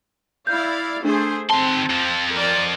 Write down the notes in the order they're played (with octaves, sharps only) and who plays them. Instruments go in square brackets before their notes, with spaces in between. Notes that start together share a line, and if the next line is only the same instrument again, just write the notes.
[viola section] E4 D5 F5 [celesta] G6
[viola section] A3 G#4 C5 [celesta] D4
[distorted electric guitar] D#3 C6 [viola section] C4 [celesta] A5
[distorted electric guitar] F2 F3
[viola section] A#4 D5